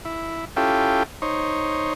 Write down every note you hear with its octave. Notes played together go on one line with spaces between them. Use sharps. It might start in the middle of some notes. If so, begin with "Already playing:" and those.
E4
C#4 E4 F4 G4 A4 G5
D#4 C5 C#5